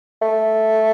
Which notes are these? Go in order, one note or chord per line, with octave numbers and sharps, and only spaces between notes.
A3